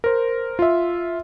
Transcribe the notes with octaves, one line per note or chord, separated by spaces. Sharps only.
A#4 C5
F4 E5